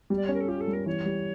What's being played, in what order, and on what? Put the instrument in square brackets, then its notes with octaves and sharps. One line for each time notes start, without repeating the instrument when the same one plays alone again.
[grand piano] G3
[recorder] D5
C#5
[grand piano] C#4 [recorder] A#4
[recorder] A4
[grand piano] F4 [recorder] G4
[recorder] A4
[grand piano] G3
[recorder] A#4
[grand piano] E3 [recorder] C#5
[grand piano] G3